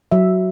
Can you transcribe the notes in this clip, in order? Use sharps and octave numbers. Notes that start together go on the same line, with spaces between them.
F#3 E5